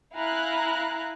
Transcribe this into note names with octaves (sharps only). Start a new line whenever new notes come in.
E4 F5 G#5 A#5 F#6